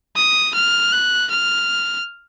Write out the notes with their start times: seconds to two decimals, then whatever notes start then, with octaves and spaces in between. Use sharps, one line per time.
0.16 D#6
0.55 F6
0.92 F#6
1.31 F6